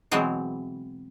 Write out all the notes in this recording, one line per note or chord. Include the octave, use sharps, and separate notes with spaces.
B2 E3 F#3 G#3 C4 F#5